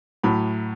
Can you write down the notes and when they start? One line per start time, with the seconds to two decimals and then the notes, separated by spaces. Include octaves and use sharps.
0.23 A2 F#3 B5